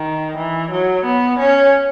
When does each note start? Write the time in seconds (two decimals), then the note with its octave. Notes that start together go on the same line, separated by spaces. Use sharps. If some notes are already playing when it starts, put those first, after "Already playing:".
Already playing: D#3
0.37 E3
0.71 F#3
1.05 B3
1.39 C#4